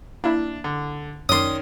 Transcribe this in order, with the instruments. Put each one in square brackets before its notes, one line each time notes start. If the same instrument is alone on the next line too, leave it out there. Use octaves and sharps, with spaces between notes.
[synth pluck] A#3 E4 [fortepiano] D4
[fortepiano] D3
[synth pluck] F#2 D5 [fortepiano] D#3 C#4 [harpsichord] C6 D#6